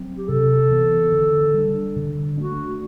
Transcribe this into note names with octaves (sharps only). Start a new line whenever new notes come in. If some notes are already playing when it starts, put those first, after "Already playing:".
Already playing: F#3 C4
G4
C3 A4
E3 B3
D3
G3 D4
D3
A3 D4 F#4